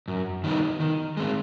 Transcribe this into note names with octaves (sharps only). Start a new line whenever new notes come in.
F#2
D#3 G3 B3 D#4
D#3
G#3 C4